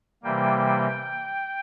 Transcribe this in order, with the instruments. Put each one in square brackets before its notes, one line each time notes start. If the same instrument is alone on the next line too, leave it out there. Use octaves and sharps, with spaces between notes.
[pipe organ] C3 E3 G3 A#3 G5